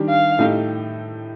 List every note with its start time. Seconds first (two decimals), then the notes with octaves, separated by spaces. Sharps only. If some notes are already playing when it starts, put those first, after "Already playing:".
Already playing: D#3 G3 D4 G4
0.09 F5
0.39 A2 A3 D#4 G4